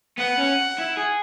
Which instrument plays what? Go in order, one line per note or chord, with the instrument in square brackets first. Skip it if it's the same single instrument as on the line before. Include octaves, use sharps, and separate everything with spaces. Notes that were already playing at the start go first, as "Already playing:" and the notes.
[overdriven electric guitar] B3 [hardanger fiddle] F#5
[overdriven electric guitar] C#4
E4
G#4